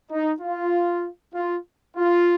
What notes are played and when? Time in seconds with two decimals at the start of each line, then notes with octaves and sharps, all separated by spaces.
0.11 D#4
0.41 F4
1.34 F4
1.96 F4